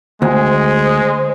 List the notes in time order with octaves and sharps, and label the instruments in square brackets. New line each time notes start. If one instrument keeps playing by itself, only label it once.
[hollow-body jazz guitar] D2 [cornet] G#3 [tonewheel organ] C5